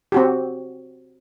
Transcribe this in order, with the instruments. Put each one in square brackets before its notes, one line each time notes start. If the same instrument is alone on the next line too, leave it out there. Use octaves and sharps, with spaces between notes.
[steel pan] C4 F#4 G4